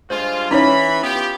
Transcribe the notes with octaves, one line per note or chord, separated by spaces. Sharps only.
G2 G#3 F4 C5
E3 C#4 D#4 C#5 B5
B3 F4 G4